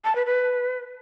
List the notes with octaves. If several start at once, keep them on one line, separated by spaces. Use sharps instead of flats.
A5
B4
B4